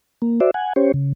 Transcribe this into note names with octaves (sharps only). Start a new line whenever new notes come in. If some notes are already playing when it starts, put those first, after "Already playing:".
A#3
F#4 C5 D5 E5
F#5 G#5
C#4 G4 C5 C#5
C#3